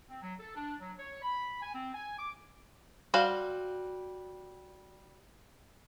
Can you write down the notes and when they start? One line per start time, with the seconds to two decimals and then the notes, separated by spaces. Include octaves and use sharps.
0.09 C4
0.22 F#3
0.39 A4
0.55 D4
0.79 F#3
0.98 C#5
1.22 B5
1.61 G#5
1.73 C4
1.93 G#5
2.18 D6
3.14 G3 F#4 C5 F5